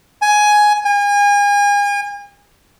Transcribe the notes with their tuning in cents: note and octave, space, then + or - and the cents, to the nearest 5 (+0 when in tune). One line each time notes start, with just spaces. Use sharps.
G#5 +10
G#5 -35